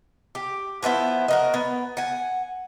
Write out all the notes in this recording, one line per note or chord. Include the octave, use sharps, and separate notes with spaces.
G4
F3 B3 E4 C5
F#4 A#4 D#5
B3
F#5 G#5